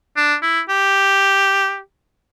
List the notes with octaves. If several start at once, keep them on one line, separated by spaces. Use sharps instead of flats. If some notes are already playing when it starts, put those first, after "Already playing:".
D4
E4
G4